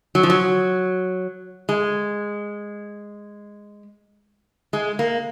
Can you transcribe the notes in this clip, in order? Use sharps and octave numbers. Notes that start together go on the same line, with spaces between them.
F#3
F3
F#3
G#3
G#3
A#3